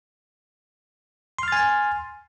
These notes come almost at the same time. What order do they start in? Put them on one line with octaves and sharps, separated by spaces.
C6 F6 A6 G#5